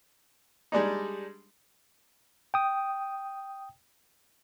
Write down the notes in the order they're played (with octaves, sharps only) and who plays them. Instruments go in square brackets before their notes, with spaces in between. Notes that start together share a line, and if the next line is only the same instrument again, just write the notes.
[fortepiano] G3 G#3 D4 D#4
[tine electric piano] G5 D#6